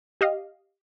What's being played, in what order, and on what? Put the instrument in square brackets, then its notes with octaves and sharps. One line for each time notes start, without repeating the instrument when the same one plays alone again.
[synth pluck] G4 D#5 F5